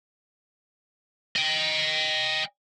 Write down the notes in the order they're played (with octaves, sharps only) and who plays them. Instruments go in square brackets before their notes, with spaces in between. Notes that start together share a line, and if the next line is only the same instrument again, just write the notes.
[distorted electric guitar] D#5 G5